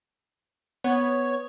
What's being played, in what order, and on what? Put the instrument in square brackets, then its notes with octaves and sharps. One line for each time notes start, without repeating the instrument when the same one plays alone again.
[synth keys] B3 [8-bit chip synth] C#5